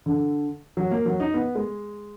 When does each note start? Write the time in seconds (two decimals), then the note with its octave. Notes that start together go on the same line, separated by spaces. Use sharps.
0.06 D3
0.77 F#3
0.91 A#3
1.06 F#3
1.20 D#4
1.34 B3
1.55 G#3